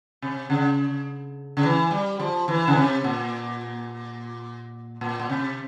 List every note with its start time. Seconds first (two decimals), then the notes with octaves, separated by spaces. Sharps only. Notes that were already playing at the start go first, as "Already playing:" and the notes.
0.22 C3
0.50 C#3
1.57 C#3
1.63 E3
1.91 G3
2.20 F3
2.48 E3
2.67 C#3
2.75 C3
3.04 A#2
5.01 A#2
5.20 A#2
5.30 C3